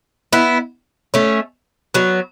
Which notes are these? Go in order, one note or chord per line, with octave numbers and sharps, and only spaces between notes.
B3 E4
A3 C#4
F#3 B3